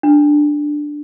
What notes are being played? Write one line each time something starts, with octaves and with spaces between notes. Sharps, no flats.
D4